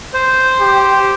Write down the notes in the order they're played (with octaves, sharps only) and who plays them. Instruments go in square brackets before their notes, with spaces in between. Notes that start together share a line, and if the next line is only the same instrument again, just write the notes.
[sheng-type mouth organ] C5
[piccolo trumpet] G4